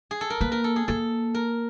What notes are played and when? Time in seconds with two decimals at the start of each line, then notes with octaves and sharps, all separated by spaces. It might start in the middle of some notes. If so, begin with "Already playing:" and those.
0.11 G#4
0.21 A4
0.30 A#4
0.41 A#3 B4
0.52 A#4
0.64 A4
0.76 G#4
0.88 A#3 A4
1.35 A#4